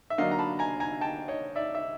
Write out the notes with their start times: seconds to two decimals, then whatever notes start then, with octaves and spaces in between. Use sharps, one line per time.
0.10 E5
0.18 D3 F#3 A#3 D4 D#5 F5
0.31 A#5
0.38 A5 B5
0.59 G#5 A#5
0.80 G#5 A#5
1.01 G5 A5
1.28 C#5 D#5
1.56 D5 E5
1.75 E5